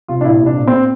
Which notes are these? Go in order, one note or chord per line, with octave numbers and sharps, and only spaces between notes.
C2 F4
D4
A#2 E4
C2
D4
A#2
C4